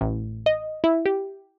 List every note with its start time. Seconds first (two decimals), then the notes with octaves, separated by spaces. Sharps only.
0.01 A1
0.46 D#5
0.84 E4
1.05 G4